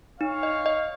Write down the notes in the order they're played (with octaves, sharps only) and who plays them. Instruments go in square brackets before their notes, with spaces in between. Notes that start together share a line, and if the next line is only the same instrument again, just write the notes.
[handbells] D#4 [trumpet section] C#5 F5
[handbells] D#5
D#5